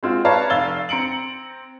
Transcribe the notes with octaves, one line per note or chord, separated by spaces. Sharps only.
G#3 C4 F4 F#4
B4 C#5 D5 F5 A5 A#5
F1 F5 E6 A6 G7
C4 A#5 C#7 D7 F#7